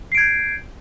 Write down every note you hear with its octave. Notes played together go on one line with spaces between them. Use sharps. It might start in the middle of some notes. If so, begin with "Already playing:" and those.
G6 G#6 C7 D7